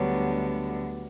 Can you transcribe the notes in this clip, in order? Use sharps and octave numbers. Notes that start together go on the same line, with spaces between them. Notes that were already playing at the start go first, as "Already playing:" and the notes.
Already playing: D2 D3 F#3 G3 B3 D4